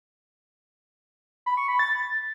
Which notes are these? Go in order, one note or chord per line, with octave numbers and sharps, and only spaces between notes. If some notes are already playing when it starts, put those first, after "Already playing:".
B5
C#6
B5
A6